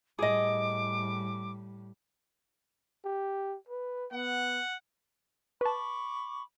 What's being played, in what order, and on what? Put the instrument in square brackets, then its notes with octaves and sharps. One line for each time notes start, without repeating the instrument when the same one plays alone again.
[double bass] A2 G3 [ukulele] G#4 D#5 [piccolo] D6
[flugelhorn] G4
B4
[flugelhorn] B3 [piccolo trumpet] F#5
[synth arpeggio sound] B4 A5 [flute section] B5 C#6 D6